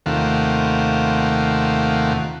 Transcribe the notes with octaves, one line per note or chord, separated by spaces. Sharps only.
D#2 C3 D#3 A3 F4 F#5